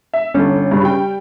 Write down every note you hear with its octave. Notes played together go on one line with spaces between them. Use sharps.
E5
G1 C#4 A4
G2 C#3
G3 G5